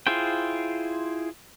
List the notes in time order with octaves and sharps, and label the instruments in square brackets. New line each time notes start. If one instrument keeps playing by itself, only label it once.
[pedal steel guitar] E4 F4 G#4 C5 G5